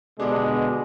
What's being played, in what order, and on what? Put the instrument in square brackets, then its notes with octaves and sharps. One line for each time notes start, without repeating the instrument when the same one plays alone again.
[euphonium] B2 [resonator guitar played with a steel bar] D3 B3 D4 [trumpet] G#3 [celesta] G4 A4 D5